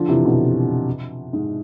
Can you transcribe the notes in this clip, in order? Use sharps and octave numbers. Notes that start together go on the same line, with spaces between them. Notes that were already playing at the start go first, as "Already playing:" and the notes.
Already playing: D3 F3
C3 E3
B2 D3
G#2